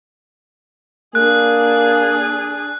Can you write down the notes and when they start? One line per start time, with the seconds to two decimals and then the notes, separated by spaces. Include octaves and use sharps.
1.15 A#3 D4 G#4 F#6